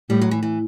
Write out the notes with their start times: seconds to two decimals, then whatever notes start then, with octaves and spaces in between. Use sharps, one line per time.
0.10 A2 G3
0.22 F#3
0.31 E3
0.43 E3